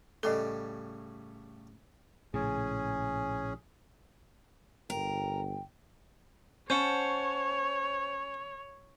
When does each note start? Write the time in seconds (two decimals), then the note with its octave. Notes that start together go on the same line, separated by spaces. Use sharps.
0.23 A2 C#3 G3 A4 D#5
2.34 A#1 A2 C#3 C#4 G#4
4.90 G1 A#4 G5
6.70 C#4 C5 C#5 F#5 A5